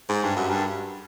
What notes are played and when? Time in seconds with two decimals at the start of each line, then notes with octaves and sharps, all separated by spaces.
0.09 G#2
0.23 G2
0.36 F#2
0.50 G2